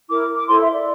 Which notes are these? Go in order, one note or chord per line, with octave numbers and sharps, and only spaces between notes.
E4 A#4 D6
D6
E4 A4 C5 C6
E5
D5